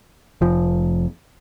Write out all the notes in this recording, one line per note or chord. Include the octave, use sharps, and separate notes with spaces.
F1 F3